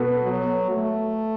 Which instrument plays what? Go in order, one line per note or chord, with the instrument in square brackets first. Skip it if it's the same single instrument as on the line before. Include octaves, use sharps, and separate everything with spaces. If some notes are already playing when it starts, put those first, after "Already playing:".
Already playing: [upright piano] B2 B3 F#4 A4
[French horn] F#3
A3